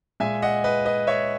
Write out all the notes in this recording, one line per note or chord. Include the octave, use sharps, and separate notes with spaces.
A#2 G#3 E5 G#5
D#5 F#5
B4 D#5
B4 D#5
C#5 E5